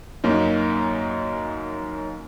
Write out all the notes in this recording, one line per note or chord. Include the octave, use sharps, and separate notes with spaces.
F#2 A#3 C#4 D#4